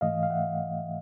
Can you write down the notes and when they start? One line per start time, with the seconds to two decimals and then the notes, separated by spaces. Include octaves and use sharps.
0.01 G#2 E3 A3 D#5 F5
0.23 F5
0.30 E5 F#5